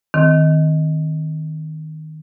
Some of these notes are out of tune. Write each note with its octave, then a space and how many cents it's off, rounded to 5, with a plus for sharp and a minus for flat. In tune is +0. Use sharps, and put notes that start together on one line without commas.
D#3 +0 C4 +0